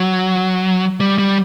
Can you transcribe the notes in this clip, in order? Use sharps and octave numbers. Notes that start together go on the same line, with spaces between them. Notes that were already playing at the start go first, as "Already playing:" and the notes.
Already playing: F#3
G3
G3